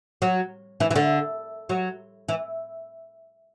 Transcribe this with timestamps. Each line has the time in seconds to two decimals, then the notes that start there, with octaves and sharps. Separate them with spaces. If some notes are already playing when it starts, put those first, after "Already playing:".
0.22 F#3
0.80 E3
0.91 E3
0.96 D3
1.69 F#3
2.29 E3